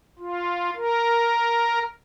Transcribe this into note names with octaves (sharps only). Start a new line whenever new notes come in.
F4
A#4